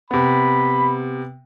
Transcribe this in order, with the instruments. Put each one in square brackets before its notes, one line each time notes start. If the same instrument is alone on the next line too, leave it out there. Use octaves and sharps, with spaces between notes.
[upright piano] C3 B3 [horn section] B5